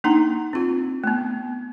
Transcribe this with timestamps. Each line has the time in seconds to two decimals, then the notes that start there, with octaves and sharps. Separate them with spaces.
0.04 A#3 D4 D#4 F#5 A#5
0.53 C4 F4
1.04 A3 B3